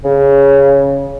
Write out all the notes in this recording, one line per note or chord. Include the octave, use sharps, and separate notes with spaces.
C#3